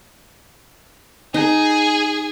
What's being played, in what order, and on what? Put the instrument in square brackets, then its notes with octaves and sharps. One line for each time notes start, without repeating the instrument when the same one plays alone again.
[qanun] D#4 [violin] G#4